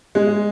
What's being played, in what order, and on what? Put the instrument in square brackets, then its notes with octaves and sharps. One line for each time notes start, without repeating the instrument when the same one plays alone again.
[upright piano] G#3